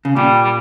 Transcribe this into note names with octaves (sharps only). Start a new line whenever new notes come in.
C#3
A#2 G3
G3